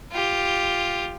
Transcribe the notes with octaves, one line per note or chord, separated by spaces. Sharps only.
F4 G4